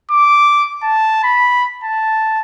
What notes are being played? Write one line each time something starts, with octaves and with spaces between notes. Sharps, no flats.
D6
A5
B5
A5